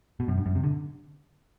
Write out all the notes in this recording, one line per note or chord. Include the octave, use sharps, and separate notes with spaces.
B2
F#2
G2
F#2
C3
D3